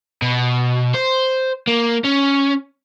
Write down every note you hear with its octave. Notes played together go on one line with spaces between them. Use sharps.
B2
C5
A#3
C#4